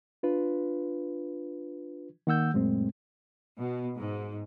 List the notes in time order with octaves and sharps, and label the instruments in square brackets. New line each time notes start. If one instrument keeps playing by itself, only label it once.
[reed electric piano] D4 F4 B4
D#3 A#3 F#5 E6 G6
F#2 A#2 G#3 A3 C4
[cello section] B2
G#2